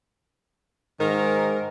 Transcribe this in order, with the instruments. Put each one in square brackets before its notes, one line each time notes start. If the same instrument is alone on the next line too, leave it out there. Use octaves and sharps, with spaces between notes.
[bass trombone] G#2 [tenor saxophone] D#3 [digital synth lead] A#4